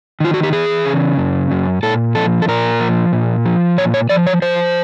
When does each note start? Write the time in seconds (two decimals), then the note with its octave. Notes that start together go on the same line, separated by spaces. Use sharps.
0.20 D#3 F4
0.34 F#4
0.43 G4
0.52 E3 G#4
0.85 C#3
1.18 F#2
1.51 F#2
1.83 A#2 A4
2.15 F3 A4
2.42 A4
2.48 A#2 A#4
2.80 F3
3.12 A#2
3.46 F3
3.78 A#2 C#5
3.94 C#5
4.09 F3 D5
4.27 C#5
4.42 F3 C5